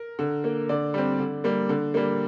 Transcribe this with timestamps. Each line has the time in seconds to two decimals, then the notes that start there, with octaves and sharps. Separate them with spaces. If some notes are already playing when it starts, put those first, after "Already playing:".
Already playing: A#4
0.19 D3
0.44 A#3
0.69 D3 D5
0.94 G3 C4
1.19 D3
1.44 G3 A#3
1.69 D3
1.94 G3 A#3